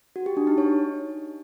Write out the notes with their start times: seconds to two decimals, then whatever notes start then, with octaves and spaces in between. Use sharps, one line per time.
0.16 F#4
0.26 G4
0.37 D4
0.47 D#4
0.58 C#5